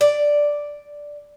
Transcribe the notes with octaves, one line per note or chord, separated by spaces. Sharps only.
D5